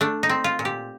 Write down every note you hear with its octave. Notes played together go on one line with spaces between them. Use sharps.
A3 D4
D#4
C4
F4
A#2
G4